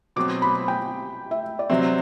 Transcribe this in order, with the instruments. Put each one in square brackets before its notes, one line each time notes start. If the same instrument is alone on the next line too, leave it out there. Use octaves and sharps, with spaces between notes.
[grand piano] B2 F#3 C4 [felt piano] D6
[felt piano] B5
G5
E5
D5
[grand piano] C3 F#3 C4 [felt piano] E5